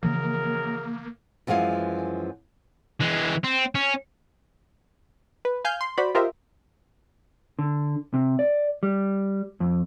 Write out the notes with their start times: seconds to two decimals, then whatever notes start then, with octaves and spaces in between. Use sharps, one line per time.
0.03 F#2 C#3 E3 F3 A#3 G#4 A#4
1.47 F#2 E3 F3 G#3 F5 G#5
3.00 E3 G#3
3.44 C4
3.75 C#4
5.45 B4
5.65 F5 G#5 F6 G6
5.81 C6
5.98 F#4 C5 D5 B5
6.15 F4 G4 A#4 C5 D#5 E5
7.59 D3
8.14 C3
8.39 D5
8.83 G3
9.60 F2